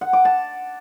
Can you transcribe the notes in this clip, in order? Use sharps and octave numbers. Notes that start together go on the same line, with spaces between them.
F#5
D6
A5